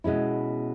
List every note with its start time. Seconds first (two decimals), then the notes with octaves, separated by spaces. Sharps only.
0.04 B2 G#3 C#4 E4